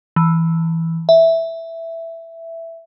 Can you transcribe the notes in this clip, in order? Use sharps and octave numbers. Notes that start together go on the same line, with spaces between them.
E3
E5